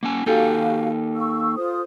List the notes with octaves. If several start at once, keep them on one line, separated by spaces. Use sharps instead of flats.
A#3 C#4 G#5
A#3 D#4 F#4 G4 A4 F5 G5 G#5
F5 C#6 E6
F4 C5 D#6